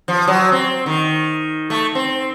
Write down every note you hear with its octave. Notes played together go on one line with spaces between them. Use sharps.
F3
F#3
C4
D#3
A3
C4